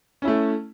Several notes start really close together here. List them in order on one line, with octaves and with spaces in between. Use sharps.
C#4 E4 A3